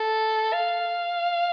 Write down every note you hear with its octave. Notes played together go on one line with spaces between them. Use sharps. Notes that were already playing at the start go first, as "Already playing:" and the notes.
Already playing: A4
F5